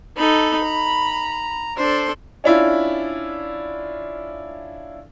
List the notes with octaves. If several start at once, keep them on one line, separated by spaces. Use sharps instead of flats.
D#4 A4 B5
A#5
D4 A4 C5
C#4 D4 E4 F4